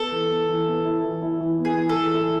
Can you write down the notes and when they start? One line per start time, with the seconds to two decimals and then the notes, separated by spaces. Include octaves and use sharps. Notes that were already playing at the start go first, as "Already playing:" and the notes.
Already playing: B3 A4
0.11 E3
0.30 B3
0.49 E3
0.67 B3
0.85 E4
1.04 E3
1.22 E4
1.41 E3
1.59 B3
1.65 G#4
1.77 E3
1.89 A4
1.96 E3
2.14 E4